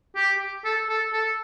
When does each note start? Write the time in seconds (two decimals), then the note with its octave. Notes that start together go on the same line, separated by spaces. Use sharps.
0.16 G4
0.65 A4
0.90 A4
1.14 A4